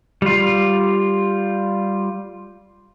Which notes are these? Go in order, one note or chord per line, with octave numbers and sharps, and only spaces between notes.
G3 F4